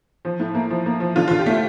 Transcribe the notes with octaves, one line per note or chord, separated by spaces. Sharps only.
F3
A2
A#3
F3
A#3
F3
D3 F4
D3 F4
G4
A3 F4